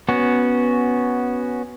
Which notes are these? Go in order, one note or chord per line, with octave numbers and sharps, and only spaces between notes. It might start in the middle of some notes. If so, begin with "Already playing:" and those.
B3 C#4 F#4